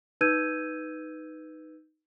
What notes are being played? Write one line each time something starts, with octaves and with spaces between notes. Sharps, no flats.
D#4 B4 E6 G6 G#6 D#7